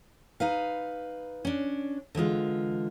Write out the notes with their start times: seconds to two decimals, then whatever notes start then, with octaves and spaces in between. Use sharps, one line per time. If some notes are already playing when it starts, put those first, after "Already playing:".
0.40 D#4 B4 F5
1.45 C#4 D4
2.15 D3 E3 G#3 F4